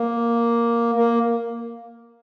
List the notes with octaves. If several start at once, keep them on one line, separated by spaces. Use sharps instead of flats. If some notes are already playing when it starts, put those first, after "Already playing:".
Already playing: A#3
A#3